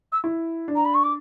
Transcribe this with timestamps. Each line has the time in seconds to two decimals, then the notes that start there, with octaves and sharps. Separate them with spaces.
0.12 E6
0.24 E4
0.68 D4
0.75 A#5
0.85 B5
0.94 C#6
1.03 D6